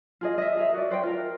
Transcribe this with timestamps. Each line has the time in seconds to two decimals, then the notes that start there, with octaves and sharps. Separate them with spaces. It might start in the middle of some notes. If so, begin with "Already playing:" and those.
0.21 F4 G#4 D#5
0.38 D#5 E5
0.57 G#4 A#4 E5
0.74 F#4 D5
0.90 B4 C5 F#5 G5
1.03 F4 A#4